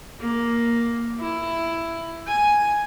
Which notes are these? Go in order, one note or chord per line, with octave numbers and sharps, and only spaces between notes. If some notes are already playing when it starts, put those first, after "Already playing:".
A#3
E4
G#5